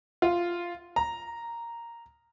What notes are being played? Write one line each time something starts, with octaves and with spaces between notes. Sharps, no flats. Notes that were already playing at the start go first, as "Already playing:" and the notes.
F4
A#5